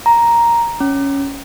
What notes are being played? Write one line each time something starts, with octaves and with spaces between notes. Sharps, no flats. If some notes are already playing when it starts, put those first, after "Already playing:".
A#5
C#4